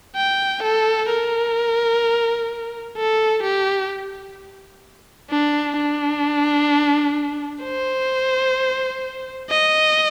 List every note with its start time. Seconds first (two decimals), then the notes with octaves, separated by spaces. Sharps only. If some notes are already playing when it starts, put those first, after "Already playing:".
0.16 G5
0.63 A4
1.09 A#4
2.97 A4
3.43 G4
5.30 D4
5.76 D4
7.63 C5
9.50 D#5